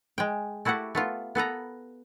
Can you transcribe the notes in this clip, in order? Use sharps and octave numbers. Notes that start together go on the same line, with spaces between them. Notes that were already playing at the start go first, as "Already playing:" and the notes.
G#3 G5
A3 E4 F#4 G4 F#5 A5
A3 B3 F4
B3 A4 B4 A#5